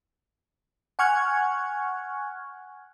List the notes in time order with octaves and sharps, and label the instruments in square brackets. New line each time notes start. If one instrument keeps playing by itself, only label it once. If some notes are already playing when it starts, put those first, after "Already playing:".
[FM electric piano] F#5 G#5 C#6 F6 F#6 G#6